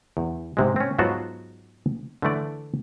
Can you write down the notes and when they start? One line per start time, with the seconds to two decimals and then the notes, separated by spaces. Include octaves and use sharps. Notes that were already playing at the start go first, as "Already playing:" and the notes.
0.17 E2
0.57 G#2 C3 G#3
0.76 C4 C#4
0.98 G#2 F#3 B3 F4 F#4 A5
2.22 D3 E3 A3 D5